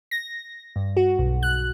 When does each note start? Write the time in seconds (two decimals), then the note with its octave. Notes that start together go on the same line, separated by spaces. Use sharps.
0.11 A#6
0.76 G2
0.97 F#4
1.19 B1
1.43 F#6